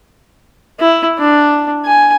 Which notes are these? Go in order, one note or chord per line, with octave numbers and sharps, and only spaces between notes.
E4
D4
G#5